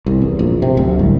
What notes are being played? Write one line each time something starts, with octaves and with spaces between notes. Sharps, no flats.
C2
E2
A#1
C3
D1
C2